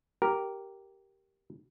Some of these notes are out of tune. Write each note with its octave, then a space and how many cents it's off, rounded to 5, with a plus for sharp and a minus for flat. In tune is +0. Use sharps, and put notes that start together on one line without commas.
G4 -10 A#4 +0